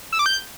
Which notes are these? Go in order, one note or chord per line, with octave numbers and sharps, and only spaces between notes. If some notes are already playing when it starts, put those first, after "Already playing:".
E6
D6
G6